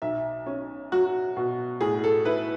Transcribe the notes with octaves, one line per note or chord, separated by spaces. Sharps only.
B1 E5
C#4
F#3 F#4
B2
A2 G#4
A4
E4 B4